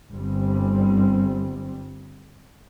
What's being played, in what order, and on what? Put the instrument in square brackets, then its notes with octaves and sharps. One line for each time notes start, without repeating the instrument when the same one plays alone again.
[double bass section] G1 G3 C4